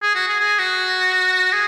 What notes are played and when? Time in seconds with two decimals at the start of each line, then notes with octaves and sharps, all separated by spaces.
0.02 G#4
0.15 F#4
0.28 G#4
0.40 G#4
0.59 F#4
1.53 G#4